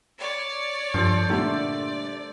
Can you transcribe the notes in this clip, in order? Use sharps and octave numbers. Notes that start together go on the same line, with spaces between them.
C#5 D5
G2 F3 A4 C5
A#2 D3 G3 A3 D5